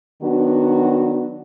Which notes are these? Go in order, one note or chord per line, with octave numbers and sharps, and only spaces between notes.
D#3 F#3 B3 D4 F#4